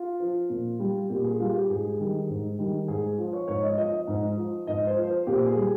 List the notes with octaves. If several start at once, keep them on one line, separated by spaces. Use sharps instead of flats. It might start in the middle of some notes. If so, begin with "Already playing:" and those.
Already playing: F4
F3
A#2
G3
A#2 G4
G#4
G3 F4
G4
G#2 G#4
D#3 G3
G#2
D#3 G3
G#2 G#4
F3
C#5
G#2 C#5
D#5
F3 D#5
D#5
G#2
F3
G#2 D#5
C5
F3
C5
A#2 G4
G#4
G3